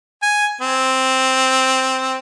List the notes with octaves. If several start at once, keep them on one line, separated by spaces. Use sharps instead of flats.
G#5
C4